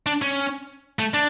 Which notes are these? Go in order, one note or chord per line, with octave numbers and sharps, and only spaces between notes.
D4
C#4
A3
D4